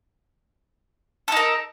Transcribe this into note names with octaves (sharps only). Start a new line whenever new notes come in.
D#4 A4 A#4